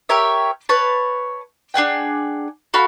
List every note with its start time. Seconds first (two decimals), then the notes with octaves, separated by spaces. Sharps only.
0.09 G4 A#4 C#5 E5
0.69 B4 C#5 A5
1.74 D4 G#4 F#5 G5
2.74 F#4 A4 F5 B5